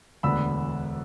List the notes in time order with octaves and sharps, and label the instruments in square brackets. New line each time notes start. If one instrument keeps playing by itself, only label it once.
[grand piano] E1 D2 D3 B3 B5 E6